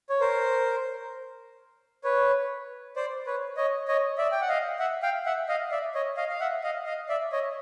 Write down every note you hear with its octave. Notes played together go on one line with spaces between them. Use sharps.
C#5
A#4 C5
B4 C#5
C5 D5
B4 C#5
C#5 D#5
C#5 D#5
D5 E5
G5
F#5
D#5 F5
E5 F#5
F5 G5
E5 F#5
D#5 F5
D5 E5
C#5 D#5
D#5 F5
F5
E5 F#5
D#5 F5
D#5 F5
D5 E5
C#5 D#5